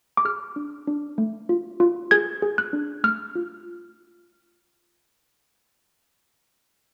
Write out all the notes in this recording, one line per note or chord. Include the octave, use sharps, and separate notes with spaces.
D6
G#4 F6
D4
D4
A3
F4
F4
G#4 G#6
G#4
F#6
D4
A3 F6
F4